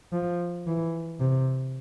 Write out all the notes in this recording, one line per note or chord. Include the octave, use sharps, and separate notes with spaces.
F3
E3
C3